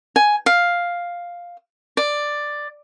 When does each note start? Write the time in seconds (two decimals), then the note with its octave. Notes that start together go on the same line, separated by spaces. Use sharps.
0.16 G#5
0.46 F5
1.97 D5